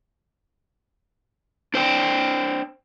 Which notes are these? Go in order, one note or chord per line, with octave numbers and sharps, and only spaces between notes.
D4 C5 D5 G5